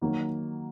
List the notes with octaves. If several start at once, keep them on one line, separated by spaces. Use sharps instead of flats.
D#3 F#3 A#3